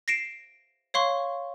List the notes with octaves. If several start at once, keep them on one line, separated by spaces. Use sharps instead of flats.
A#6 C7 D7 E7
C#5 F5 C6 C#6